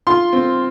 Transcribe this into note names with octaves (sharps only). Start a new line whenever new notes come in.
F4 C6
C4